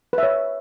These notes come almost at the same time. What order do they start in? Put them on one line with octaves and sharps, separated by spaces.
B4 E5 C#5